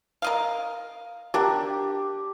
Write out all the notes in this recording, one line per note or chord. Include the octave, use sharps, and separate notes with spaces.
A#4 D#5 F5
D4 G4 A#4